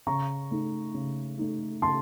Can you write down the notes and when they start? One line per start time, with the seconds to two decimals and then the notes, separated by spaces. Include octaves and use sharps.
0.07 C#3 A#5 C#6
0.51 A3 D#4
0.94 C#3
1.38 A3 D#4
1.82 C#3 A5 C6